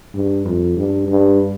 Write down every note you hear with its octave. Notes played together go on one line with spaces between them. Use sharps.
G2
F2
G2
G2